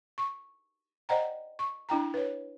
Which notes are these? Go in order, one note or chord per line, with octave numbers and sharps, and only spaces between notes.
C#6
C5 D5 D#5 F#5 G5 A#5
C#6
D4 E4 G5 A#5
B4 C#5